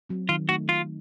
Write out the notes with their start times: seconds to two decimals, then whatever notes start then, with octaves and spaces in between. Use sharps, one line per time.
0.09 F#3 C4
0.29 D#3 F4
0.49 A3 D#4 F#4
0.69 A3 F4